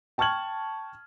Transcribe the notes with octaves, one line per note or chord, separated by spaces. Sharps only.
G5 A5 C#6 F6 G#6 F#7